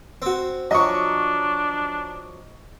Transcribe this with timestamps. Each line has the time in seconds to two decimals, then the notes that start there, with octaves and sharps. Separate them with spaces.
0.22 C4 F#4
0.71 F3 F#3 D4 D#5 C#6